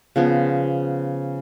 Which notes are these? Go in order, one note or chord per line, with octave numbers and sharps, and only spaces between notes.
C#3 F3 B3